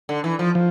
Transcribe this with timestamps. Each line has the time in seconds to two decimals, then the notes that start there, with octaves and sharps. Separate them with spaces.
0.09 D3
0.24 E3
0.39 F3
0.55 F3